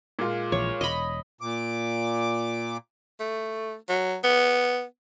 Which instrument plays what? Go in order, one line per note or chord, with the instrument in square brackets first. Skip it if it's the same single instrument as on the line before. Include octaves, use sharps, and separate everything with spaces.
[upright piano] A#2 G#3 F4
[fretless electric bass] A#1 E3 [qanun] C#5
[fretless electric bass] E1 [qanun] D#5 B5
[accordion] A#2 D6
[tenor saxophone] A3
F#3
B3